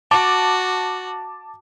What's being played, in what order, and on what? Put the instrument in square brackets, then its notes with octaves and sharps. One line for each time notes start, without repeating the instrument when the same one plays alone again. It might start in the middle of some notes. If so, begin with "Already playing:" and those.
[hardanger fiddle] F#4 [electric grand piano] A5 D6